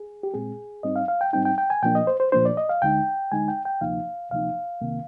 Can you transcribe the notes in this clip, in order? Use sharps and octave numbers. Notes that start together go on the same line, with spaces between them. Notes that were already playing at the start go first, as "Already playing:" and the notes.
Already playing: G#4
G4
A#2 G#3 C4 G#4
G#2 G3 C4 D#4 D#5
F5
F5
G5
G#2 G3 C4 D#4 G5
G5
G5
G#5
A#2 F3 A#3 D4 G5
D#5
C5
C5
A#2 F3 A#3 D4 C5
D5
D#5
F5
D2 D3 G#3 D#4 G5
D2 D3 G#3 D#4 G#5
G5
G5
D2 C3 F3 A#3 D#4 F5
D2 C3 F3 A#3 D#4 F5
C2 C3 D#3 A#3